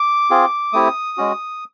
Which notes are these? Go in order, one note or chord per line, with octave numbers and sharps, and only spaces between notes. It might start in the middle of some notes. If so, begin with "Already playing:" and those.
Already playing: D6
C4 F4 G#4
A3 C4 E4 G4 D#6
G#3 C#4 F#4